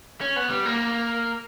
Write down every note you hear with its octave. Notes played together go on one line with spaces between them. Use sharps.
C#4
B3
G3
A#3